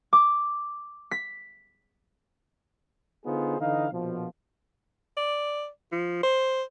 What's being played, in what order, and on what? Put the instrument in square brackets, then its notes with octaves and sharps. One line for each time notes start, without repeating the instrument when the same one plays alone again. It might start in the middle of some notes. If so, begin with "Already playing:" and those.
[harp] D6
B6
[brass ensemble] D3 B3 D#4 F4 G#4 C5
D3 E3 D#4 D#5 F5
A#1 B2 F3
[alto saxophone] D5
F3
C5